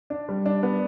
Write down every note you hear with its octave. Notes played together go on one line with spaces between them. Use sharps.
D4
G3
D4
B3